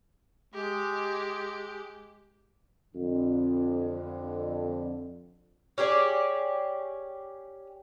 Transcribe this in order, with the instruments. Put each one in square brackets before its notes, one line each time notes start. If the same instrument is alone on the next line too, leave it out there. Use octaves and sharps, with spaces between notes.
[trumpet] G#3 [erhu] G4
[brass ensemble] F2 D3
[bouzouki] C#4 G4 G#4 D5